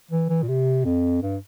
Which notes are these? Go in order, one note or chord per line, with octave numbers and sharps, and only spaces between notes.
E3
E3
A#2
C3
F2
G2